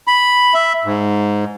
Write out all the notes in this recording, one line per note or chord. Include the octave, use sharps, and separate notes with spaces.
B5
E5
G#2